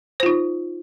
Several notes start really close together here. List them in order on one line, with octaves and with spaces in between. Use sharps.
C5 F4 D#4